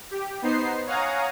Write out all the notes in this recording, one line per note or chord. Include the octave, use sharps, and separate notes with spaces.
G4
B3 D#4 C5 C7
C#5 F5 F#5 G#5 A#5 D#6